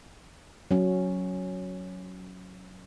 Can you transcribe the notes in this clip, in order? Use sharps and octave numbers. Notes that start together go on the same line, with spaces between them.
F#3 C#4